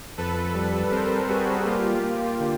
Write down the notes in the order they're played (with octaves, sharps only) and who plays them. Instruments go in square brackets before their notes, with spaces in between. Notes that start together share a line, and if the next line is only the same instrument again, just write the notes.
[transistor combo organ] F2 [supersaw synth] A4 B4
[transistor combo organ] G3
[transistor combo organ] C4 [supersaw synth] A#4 C5
[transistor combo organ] G3 [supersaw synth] F#4 G#4
[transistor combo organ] A#3 [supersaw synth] F4 G4
[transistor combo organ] A#3
D3